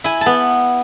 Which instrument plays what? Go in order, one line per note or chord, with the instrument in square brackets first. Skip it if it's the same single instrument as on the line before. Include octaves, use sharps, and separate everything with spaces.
[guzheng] E4 G#5
A5
B3